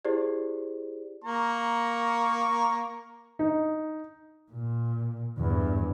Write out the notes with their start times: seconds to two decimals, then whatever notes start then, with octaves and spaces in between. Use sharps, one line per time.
0.05 E4 G4 G#4 C5 D5
1.24 A#3 A#5 C#6
3.39 D#4
4.51 A#2
5.38 E2 G2